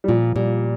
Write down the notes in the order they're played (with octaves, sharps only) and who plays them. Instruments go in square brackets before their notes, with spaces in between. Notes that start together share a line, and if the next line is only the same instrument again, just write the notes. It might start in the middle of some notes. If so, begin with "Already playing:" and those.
[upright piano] G3
[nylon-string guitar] A#2 [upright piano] F3
[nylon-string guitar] A#2 [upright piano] G3